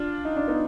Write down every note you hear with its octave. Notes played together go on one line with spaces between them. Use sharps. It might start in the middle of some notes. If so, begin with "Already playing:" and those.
Already playing: D4 F4
D#4
D4
B3 D#4